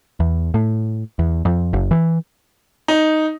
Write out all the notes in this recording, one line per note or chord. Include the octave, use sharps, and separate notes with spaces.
E2
A2
E2
F2
F#1
E3
D#4